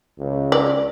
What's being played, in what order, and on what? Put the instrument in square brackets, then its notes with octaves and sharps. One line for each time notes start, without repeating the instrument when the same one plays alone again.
[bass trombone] C#2
[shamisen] D5